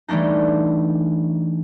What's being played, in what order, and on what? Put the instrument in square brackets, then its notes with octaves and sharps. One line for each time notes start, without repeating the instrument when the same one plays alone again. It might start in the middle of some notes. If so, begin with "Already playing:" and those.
[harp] E3 G3 A3 D4 D#4